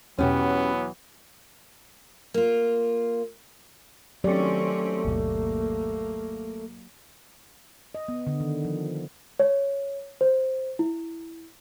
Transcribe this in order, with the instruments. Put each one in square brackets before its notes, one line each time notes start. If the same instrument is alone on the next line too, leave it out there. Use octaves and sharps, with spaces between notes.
[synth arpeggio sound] E2 B2 [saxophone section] E3 F#3 [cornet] B3 [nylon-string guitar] C#4 G4
[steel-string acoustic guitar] A#3 F4
[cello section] D#3 C4 C#4 [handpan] F#3 G4 D5 [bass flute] A3
[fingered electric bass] G#1 D#2 B2 [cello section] A#3
[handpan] D#5
B3
D3
D#3
F3
[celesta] C#5
C5
E4